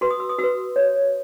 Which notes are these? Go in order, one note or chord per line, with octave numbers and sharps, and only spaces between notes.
F#4 B4 C6
D#6
E6
D#6
F#4 B4 E6
C#5